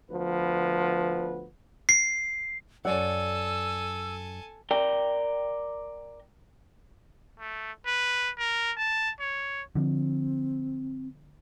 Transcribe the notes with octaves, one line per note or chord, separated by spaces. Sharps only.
D2 F3 B3 B4
C7
F#2 A4 C#5 D5 F#5 G#5 E6
A#4 D5 G5
A3
B4
A#4
A5
C#5
D3 F3 C4